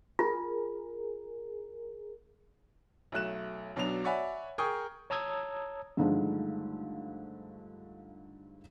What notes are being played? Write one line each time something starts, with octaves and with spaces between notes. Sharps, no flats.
F4 G#4 A#4
B1 F#3 A3 F#6 E7
B1 B2 F#3 D4 F7
C#5 D5 E5 F#5 G#5 B5
G#4 A#4 G5 C#6 D#6 G6
C#5 A5 A#5 D#6 E6 G#6
G2 D3 D#3 F3 G#3 A3